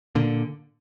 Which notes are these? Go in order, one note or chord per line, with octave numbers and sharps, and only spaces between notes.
A#2 D3